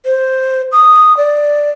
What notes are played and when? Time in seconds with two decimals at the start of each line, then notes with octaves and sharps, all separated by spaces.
0.05 C5
0.72 D#6
1.17 D5